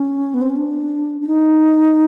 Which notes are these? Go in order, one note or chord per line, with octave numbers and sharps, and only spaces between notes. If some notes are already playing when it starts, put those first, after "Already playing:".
Already playing: C#4
B3
C4
C#4
D4
D4
D#4